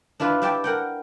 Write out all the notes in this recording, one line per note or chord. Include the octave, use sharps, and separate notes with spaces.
D4 E4 F4 B4
G4 E5 G5 A5
A#4 F#5 G5